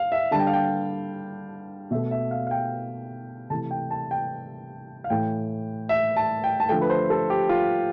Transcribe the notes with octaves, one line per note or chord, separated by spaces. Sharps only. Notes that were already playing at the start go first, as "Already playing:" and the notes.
Already playing: F5
E5
D3 G3 A5
G5
F5
G5
B2 A3 E5
E5
F5
F5
G5
C3 E3 A3 A5
G5
A5
G5
F5
A2 E3 A3 G5
E5
A5
G5
A5
D3 F3 A3 G5
B4
C5
A4
G4
F4